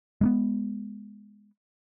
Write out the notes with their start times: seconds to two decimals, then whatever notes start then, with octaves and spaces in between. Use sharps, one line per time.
0.21 G#3 A#3 B3